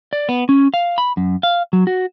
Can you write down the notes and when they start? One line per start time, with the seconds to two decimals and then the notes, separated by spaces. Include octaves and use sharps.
0.13 D5
0.29 B3
0.49 C#4
0.74 F5
0.98 B5
1.17 F#2
1.43 F5
1.73 F#3
1.87 F#4